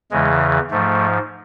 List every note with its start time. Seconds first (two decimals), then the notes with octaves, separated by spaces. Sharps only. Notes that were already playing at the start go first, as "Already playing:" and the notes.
0.11 E2 C#3 E3 G#3
0.71 G#2 F3 A3